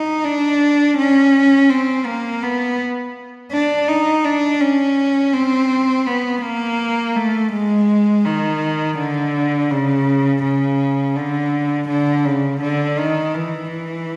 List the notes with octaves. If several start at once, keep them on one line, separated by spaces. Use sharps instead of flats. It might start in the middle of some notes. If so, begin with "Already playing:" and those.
Already playing: D#4
D4
C#4
C4
A#3
B3
D4
D#4
D4
C#4
C4
B3
A#3
A3
G#3
D#3
D3
C#3
C#3
D3
D3
C#3
D3
D#3
E3